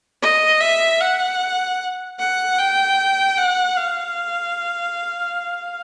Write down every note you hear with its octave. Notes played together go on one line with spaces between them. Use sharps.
D#5
E5
F#5
F#5
G5
F#5
F5